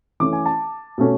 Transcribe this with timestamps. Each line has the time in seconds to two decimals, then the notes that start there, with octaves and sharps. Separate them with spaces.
0.20 E3 A3 C#4 D6
0.33 G#5
0.46 A5
0.98 B2 A3 C#4